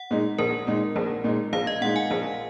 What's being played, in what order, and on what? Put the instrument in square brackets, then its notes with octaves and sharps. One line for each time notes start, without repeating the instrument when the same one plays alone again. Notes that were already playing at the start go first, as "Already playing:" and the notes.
Already playing: [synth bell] F#5
[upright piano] A#2 G#3 D#4
[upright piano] A#1 [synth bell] A#4
[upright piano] A#2 G#3 D#4
A#1
A#2 G#3 D#4
[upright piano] A#1 [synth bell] F5
[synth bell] D#5
[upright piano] A#2 G#3 D#4 [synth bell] F#5
[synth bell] G#5
[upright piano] A#1